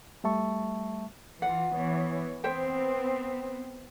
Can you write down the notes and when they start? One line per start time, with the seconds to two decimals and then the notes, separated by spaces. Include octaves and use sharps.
0.24 G3 A3 E5 A5 C#6
1.42 E3 F4 F#5
1.73 E3 B3 C#5
2.44 B3 C4 C5 E5 G5